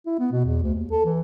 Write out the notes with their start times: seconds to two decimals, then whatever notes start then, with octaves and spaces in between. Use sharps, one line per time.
0.06 E4
0.19 B3
0.32 B2
0.45 E2
0.63 D2
0.76 D#2
0.91 A4
1.05 E3